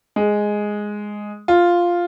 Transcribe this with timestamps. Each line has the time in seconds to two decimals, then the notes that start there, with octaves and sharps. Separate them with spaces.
0.16 G#3
1.48 F4